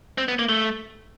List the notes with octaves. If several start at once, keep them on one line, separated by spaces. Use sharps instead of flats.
C4
B3
A#3
A3